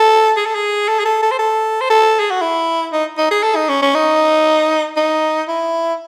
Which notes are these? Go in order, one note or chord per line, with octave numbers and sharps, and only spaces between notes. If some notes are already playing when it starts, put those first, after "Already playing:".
Already playing: A4
G#4
A4
G#4
A4
G#4
A4
A4
C5
A4
C5
A4
G#4
F#4
E4
D#4
D#4
G#4
A4
D#4
C#4
C#4
D#4
D#4
E4